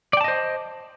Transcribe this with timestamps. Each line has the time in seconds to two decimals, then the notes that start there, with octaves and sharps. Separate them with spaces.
0.13 D5
0.17 G5
0.21 A5
0.24 D#5
0.28 C5